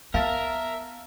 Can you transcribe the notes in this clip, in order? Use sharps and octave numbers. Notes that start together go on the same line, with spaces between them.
B3 A#4 E5 F5 A5 A6